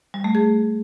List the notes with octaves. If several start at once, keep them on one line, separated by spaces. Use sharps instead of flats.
G3
A3
G#4